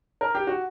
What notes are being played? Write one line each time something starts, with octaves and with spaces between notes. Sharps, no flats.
A#4
G4
F#4